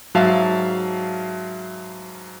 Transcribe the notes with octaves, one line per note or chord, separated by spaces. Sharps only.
G#2 F#3 E5 F5 A5